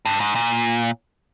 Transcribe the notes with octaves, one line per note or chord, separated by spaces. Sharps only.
G2
G#2
A#2